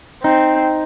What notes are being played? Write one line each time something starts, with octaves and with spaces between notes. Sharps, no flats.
C4 D#4